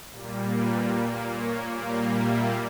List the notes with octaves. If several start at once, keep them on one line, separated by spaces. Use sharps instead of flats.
A#2 G3 A#3
B4
A#2 A#3
C#5
A#2 G3 A#3
E5